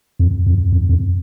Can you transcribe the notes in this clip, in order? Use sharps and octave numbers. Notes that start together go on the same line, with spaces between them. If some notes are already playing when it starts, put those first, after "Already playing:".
F2
F2
F2
F2